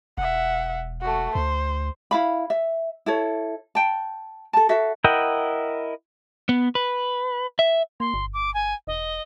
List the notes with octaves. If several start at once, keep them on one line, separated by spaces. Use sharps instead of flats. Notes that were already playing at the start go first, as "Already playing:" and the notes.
E1 E5 F#5
A3 F#4
D2 C5
E4 F5 B5
E5
E4 A4 C#5
G5 A5
A4 A5
F#4 A4 E5
E4 A#4 D#5 F#5 G5
B3
B4
E5
A#3 C6
G1
D6
G#5
E1 D#5